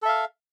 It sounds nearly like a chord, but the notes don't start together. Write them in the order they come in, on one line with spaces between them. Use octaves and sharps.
A4 E5 F5